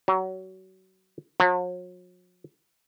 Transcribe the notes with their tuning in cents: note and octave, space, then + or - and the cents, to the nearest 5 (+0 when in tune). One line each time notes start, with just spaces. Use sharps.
F#3 +25
F#3 -45